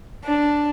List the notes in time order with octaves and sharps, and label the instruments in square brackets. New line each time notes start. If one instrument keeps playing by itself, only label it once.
[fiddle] D4